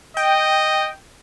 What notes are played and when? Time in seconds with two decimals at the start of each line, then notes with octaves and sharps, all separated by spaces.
0.17 D#5 G5